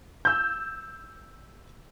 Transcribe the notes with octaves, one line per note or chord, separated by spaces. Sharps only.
E6 G6